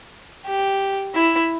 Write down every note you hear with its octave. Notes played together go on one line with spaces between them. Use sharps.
G4
E4